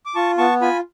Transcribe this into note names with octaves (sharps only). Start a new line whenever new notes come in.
D6
F4 A5 C#6
B3 A5 C#6
F4 G#5 B5